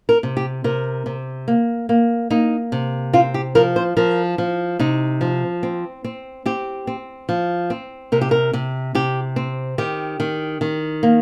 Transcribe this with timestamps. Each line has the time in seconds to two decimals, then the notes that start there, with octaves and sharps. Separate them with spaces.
0.09 A#4
0.23 C3
0.37 G4
0.64 C3 A#4
1.06 C3
1.48 A#3
1.89 A#3
2.30 A#3 D#4
2.72 C3
3.13 C4 F4
3.34 G4
3.55 F3 A#4
3.76 C5
3.97 F3 A#4
4.38 F3
4.79 C3 D#4
5.21 F3
5.63 C4
6.04 C4
6.46 C4 G4
6.87 C4
7.29 F3
7.70 C4
8.12 C3 A#4
8.21 G4
8.31 A#4
8.53 C3
8.95 C3 G4
9.36 C4
9.78 D#3 G4
10.20 D#3
10.61 D#3
11.03 A#3